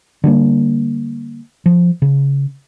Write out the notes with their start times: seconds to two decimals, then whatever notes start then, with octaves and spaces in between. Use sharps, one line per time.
0.24 D3 G3 A3 A#3
1.66 F3
2.02 C#3